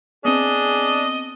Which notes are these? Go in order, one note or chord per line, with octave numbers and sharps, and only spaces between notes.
B3 C4 D4 G#4 D#5